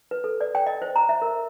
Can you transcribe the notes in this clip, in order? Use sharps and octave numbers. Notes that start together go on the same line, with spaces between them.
B4
A4
D5
G5
D#5
C5
A#5
E5
A#4